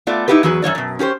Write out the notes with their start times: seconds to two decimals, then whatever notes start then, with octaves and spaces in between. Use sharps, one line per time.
0.07 A3 B3 F4 D5
0.28 D#4 E4 F#4 G4 B4
0.43 E2 F#3 F#4 G#4 B4
0.62 F#2 A#3 C#5 D5
0.75 F#2 B2
0.99 C#4 G4 B4 C5